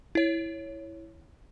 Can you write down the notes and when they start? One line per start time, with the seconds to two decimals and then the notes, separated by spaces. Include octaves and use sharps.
0.15 E4 C#5